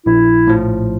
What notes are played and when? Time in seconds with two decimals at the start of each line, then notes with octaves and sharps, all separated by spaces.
0.06 A#1 E4
0.47 A2 F3